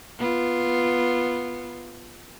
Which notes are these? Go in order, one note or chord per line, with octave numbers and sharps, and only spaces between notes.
B3 F4